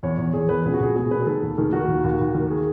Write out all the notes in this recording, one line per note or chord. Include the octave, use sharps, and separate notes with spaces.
E2 C#5
E2
E2 G#4
E2 B4
C#2 G#4
F#4
C#2 G#4
B2 G#4
B2 B4
G#4
D#3 A4
D#2
D#3 G#4
D#3 F#4
D#2
D#2
D#2
D#3
G#4